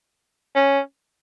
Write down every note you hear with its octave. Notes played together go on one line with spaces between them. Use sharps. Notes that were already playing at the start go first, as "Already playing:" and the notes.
C#4